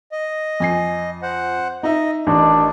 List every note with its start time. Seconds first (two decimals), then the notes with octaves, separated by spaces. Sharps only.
0.12 D#5
0.60 F2 G#5 C7
1.22 C5 F#5
1.83 D#4 D#5 E5
2.27 A1 D#3 D4